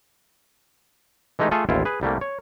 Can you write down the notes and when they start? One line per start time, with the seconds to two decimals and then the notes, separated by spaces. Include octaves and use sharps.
1.39 E3 G#3 A3 D#4 G4
1.51 A3 F4 G#4 A4 G#5
1.69 A1 D#2 E4 F4
1.85 G#4 B4
2.01 C2 G3 A3 A#3
2.21 C#5